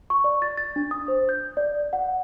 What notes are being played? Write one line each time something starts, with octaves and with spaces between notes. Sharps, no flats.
C#6
D5
A6
A6
D4
D#6
C5
G6
D5
F#5